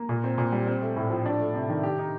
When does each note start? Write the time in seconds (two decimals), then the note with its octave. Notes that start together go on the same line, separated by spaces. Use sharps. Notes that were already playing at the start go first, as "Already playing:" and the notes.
Already playing: A#3
0.09 A#2
0.24 C4
0.38 A#2
0.52 G3
0.67 C4
0.81 A3
0.96 A2
1.11 F3
1.26 D4
1.40 A3
1.54 C3
1.69 D#3
1.83 G4
1.98 D#4